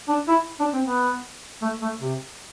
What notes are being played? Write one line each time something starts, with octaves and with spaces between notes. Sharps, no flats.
D4
E4
D4
C4
B3
A3
A3
C3